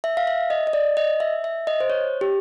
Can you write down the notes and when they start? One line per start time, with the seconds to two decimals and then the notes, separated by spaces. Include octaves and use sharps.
0.04 E5
0.17 F5
0.27 E5
0.50 D#5
0.67 D#5
0.73 D5
0.97 D#5
1.20 E5
1.44 E5
1.67 D#5
1.80 C5
1.90 C#5
2.21 G4